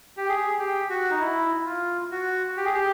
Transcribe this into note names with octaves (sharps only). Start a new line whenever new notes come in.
G4
G#4
G4
F#4
D#4
E4
F4
F#4
G4
G#4
G4